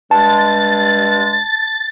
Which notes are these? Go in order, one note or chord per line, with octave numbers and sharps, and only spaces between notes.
G2 G#3 A5 A6